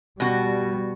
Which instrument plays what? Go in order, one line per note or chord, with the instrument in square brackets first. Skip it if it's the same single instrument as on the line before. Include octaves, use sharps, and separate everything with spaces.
[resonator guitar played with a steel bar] B2 F#4 [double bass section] G3